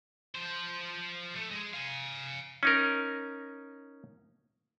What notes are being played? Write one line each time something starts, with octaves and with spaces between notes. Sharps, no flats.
F3 C5
A3
G#3
F5 G#5
C#4 D#4 A#4